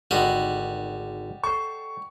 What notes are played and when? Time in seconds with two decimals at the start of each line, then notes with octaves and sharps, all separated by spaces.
0.11 G#1 D3 G3 F#4 G#4 D#5
1.43 A4 C5 C#6